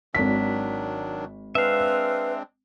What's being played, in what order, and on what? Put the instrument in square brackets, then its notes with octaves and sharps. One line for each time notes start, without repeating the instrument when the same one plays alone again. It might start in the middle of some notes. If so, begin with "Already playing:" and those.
[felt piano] G#1 B6 [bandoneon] D#3 F#3 D4
[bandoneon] G#3 C4 D4 [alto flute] B4 [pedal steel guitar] E5 F5